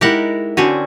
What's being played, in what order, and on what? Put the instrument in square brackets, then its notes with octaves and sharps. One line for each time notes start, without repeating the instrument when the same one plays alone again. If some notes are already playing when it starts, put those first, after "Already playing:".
[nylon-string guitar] G#3 D#4 E4 [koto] G4 A#4 F#5
[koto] D3 C4 C#4 [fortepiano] F#4